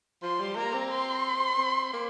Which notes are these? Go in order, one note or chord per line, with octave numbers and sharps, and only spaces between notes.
F3 C6
G3
A#3 A#5
C4
C6
C4
A#3